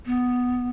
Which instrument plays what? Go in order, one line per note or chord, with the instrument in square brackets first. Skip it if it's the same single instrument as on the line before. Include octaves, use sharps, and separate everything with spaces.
[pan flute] B3